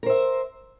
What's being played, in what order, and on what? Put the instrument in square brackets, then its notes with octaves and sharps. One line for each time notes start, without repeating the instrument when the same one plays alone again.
[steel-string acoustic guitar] A#4
C5
E5